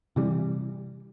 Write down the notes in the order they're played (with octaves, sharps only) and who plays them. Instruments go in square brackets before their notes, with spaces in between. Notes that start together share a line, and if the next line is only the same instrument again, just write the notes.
[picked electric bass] C3 E3 G3